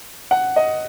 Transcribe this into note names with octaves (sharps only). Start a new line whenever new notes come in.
F#5
D#5